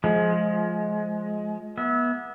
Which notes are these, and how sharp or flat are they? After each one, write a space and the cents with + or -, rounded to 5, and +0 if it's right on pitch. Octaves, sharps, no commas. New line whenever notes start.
F3 +10 G#3 +20
B3 -25 E5 -25